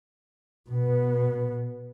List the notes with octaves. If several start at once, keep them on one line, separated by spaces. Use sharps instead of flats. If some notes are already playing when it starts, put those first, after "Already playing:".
B2 B3